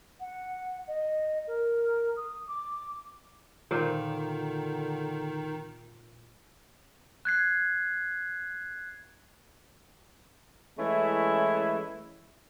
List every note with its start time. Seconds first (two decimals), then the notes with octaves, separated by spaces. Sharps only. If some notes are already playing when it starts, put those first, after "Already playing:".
0.20 F#5
0.88 D#5
1.47 A#4
2.17 D#6
2.48 D6
3.71 A#2 D3 D#3 D#4 C5
7.25 F#6 G#6 C7
10.78 E3 G#3 A3 C#4 E4